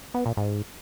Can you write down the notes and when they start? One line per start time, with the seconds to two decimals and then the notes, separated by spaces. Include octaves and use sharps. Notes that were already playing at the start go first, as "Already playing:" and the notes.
0.14 B3
0.26 A#2
0.37 G#2